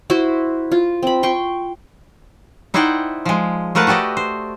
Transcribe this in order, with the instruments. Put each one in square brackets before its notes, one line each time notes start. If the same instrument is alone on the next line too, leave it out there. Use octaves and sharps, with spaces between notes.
[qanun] E4 F#4 C5
F4
C4 B5
G5 C6 C#6
[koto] D#4 E4 C5 D5 F#5 G5
F3 G#3
F3 A3 A#4 B4 F#5 A5
F#4 G4 A4 D5 D#5
C5